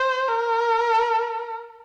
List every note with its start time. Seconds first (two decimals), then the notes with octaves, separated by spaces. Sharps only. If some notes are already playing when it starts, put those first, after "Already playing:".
Already playing: C5
0.29 A#4